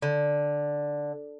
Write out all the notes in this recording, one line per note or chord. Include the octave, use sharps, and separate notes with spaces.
D3